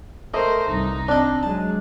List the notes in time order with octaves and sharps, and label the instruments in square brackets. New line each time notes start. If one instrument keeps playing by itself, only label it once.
[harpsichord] A3 [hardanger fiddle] A#4 C5 [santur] D#5
[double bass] C2 G2 [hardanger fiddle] D#4
[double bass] C4 [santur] D4 [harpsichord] D5 D#5
[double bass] F#3 G#3 [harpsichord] A5